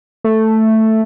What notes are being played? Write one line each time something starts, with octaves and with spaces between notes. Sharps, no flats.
A3